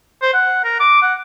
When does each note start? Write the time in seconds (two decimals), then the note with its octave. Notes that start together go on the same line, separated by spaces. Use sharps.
0.22 C5
0.34 F#5
0.64 A#4
0.80 D6
1.02 F#5